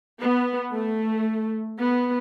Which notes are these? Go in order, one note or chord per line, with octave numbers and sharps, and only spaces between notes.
B3
A3
B3